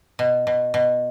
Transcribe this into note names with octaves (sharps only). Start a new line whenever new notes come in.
B2
B2
B2